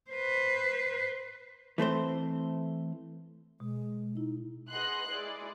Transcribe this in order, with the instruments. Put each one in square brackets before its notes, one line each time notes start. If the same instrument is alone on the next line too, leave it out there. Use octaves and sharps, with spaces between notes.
[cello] B4 C5
[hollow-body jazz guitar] E3 A3 C4 C5
[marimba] B2 [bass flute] G#3
[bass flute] D#4 [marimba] E4
[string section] G#4 B4 D#5 F#5 C6 F#6
G#3 E4 G#4 D5